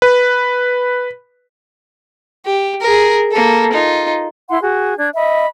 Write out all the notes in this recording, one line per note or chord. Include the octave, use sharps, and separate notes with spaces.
B4
G4
G#4 A#4
A#3 A4
D#4 F4
E4 F#5 C6
F#4 G#4
D4 G#6
D#5 E5 B5